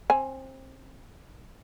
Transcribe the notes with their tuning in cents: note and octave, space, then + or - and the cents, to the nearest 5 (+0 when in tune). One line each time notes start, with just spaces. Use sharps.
C4 +25 G#5 +0